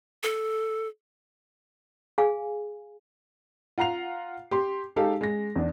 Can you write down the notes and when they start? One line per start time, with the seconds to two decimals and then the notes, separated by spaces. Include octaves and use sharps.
0.23 A4
2.18 G#4 F5 G#5
3.78 F4 F#5 A#5 C7 F7
4.51 G4 C6
4.96 G#3 D#4 G4 A4 F5
5.21 G#3 A#6
5.56 E2 D4